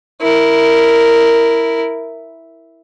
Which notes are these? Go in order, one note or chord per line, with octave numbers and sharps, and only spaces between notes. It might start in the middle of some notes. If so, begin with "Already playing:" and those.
E4 A#4